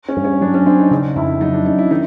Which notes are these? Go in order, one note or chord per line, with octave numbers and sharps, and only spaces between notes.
C#4
G2
C#4
F#3 D4
C#4
C4 D4
D#4
C#3 D#4
F2 E4
F#3 D#4
D4
C#4 D#4
E4
D#3 D#4